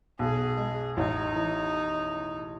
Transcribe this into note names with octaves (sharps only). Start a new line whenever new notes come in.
B1 G#4
G#3
A1 D#4
E3